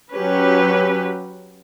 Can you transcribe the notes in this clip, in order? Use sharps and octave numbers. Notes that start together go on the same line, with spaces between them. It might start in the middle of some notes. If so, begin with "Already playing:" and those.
F#3 C#4 G4 B4